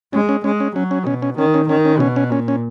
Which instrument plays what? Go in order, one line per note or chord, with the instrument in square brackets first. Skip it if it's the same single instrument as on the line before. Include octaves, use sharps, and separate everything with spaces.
[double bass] G#3 [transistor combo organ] C#4
[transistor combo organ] C#4
[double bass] G#3 [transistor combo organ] C#4
[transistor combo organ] C#4
[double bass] F#3 [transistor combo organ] C#4
[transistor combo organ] C#4
[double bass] B2 [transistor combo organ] C#4
[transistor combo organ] C#4
[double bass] D#3 [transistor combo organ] C#4
[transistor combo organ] C#4
[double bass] D#3 [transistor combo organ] C#4
[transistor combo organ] C#4
[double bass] B2 [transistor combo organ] C#4
[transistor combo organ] C#4
[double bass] A#2 [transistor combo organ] C#4
[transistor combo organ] C#4